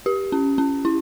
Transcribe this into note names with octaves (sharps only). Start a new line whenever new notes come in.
G4
C#4
C#4
E4